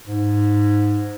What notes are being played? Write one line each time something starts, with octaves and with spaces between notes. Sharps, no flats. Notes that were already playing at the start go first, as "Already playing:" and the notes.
G#2